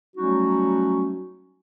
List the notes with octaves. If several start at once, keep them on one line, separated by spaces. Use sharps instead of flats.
F#3 G3 A3 C#4 D#4 F#4